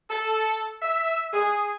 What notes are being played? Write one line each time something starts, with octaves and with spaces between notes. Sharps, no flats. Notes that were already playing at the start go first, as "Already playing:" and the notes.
A4
E5
G#4